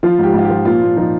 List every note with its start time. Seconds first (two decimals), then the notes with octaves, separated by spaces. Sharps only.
0.03 F3 F4
0.19 G#2 G4
0.34 G#2 F4
0.45 G4
0.50 F3
0.65 A#2 F4
0.82 A#2
0.97 F3 D#4